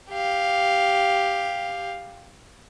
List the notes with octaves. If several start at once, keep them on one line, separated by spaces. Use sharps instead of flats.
G4 F5